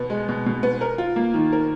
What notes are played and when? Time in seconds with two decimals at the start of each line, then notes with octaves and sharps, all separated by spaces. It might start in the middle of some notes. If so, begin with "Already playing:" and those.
Already playing: B2 B3
0.10 G#3
0.29 B2
0.46 B2
0.63 B3
0.81 A#4
0.98 F4
1.16 A#3
1.34 D#3
1.52 A#4